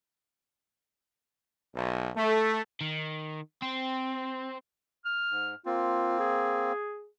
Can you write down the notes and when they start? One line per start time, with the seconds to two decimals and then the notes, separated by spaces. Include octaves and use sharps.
1.74 B1
2.15 A3
2.81 D#3
3.62 C4
5.06 F6
5.31 G#2
5.66 A#3 C4 F4
6.20 G#4